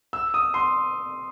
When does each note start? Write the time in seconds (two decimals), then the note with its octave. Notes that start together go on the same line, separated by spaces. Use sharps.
0.13 E6
0.34 D#6
0.54 C6